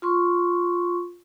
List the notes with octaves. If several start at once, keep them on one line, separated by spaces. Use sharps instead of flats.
F4 C6 C#6